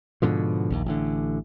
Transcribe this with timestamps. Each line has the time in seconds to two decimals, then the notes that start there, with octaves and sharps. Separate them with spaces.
0.22 G#2 B2 D3 F3
0.71 A#1 D#2
0.86 A1 D3